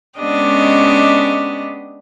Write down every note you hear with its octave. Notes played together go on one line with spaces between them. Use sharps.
G#3 B3 C#4 D4 G4 D#5